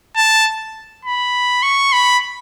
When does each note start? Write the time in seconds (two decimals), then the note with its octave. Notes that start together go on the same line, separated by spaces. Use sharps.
0.16 A5
1.05 B5
1.63 C#6
1.93 B5